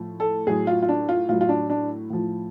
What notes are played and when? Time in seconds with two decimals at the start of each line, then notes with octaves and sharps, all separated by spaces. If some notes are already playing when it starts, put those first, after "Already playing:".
Already playing: A2 F3
0.20 A4
0.47 A2 F#3 G#4
0.67 F4
0.82 F4
0.89 D4
1.09 F4
1.29 A2 F#3 F4
1.41 F4
1.49 D4
1.70 D4
2.10 A2 F3